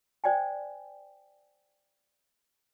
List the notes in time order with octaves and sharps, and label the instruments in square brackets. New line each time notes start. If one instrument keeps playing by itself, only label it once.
[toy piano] C5 D5 G5 G#5